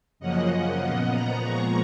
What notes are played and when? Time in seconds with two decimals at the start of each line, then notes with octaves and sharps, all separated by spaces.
0.20 F#2 C#3 F3 A#3 C#4 D#5 F#5
0.81 A#2 F3 B3 D#5 F#5
1.12 F#5 A#5
1.42 A#2 F3 G#3 A#5 C#6